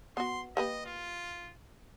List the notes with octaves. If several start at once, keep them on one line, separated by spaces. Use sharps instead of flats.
B3 F#4 C6
A#3 G4 B4 D#5
F4